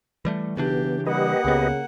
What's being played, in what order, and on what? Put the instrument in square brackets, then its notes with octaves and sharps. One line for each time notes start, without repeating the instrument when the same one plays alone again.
[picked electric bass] E3 G3 A3
[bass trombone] B1 [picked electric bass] C#3 E3 D4 [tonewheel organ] B3 [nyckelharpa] G4
[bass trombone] G3 [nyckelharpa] A#3 F#5 [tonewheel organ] G4 B4 D#5
[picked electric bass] C#2 B3 [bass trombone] C#3